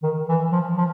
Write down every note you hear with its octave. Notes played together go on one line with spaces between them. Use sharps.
D#3
E3
F3
F3